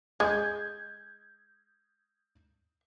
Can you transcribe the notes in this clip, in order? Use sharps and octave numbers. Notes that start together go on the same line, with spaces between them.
G#3 G6 G#6